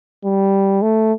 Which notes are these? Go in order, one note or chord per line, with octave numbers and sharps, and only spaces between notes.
G3
A3